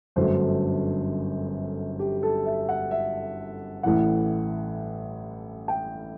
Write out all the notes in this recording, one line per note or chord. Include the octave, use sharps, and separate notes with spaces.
G1 F#2 D3 F#3 A3 C5
G4
A4
E5
F#5
E5
A1 A2 E3 F#5
G5